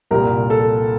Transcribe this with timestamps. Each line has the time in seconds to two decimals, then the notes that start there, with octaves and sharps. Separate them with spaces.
0.11 C2 A#2 G3 A#4
0.50 A4